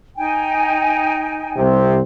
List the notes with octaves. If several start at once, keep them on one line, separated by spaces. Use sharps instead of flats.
D#4 G5 G#5
C2 C3 C4